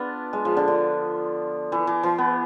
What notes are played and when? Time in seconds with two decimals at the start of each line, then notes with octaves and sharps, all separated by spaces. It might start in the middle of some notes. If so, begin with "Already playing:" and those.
Already playing: B3 D4 F4
0.33 G#3
0.45 F3
0.57 D3
0.68 D3
1.72 E3
1.87 E3
2.03 E3
2.18 B3